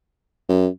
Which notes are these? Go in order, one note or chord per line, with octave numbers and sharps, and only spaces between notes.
F#2